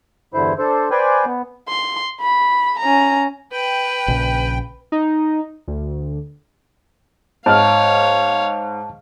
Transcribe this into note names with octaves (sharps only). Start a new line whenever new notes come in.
E2 G2 D3 E4 C5
D4 A4 C5
B4 C5 D5 G5 G#5
B3
C6
B5
C#4 A#5
B4 G5
A#1 C#3
D#4
D2
G#2 C#5 F5 A5 F6